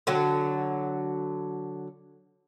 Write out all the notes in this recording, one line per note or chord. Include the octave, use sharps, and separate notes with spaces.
D3 F#3